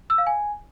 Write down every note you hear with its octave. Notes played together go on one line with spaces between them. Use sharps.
E6
F5
G#5